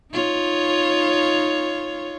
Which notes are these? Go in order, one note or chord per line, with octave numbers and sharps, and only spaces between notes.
D#4 F4 C#5